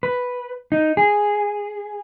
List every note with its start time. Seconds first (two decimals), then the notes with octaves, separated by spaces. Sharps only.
0.03 B4
0.72 D#4
0.97 G#4